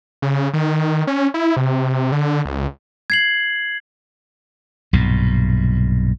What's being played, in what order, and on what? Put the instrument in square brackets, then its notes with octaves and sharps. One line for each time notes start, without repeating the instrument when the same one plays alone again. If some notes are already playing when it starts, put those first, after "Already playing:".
[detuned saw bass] C#3
D#3
C#4
E4
C3
D3
C#2
[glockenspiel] G#6 C7 F#7
[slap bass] B1 G2 A#2